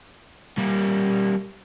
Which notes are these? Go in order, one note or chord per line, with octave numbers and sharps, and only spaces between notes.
G3 A#3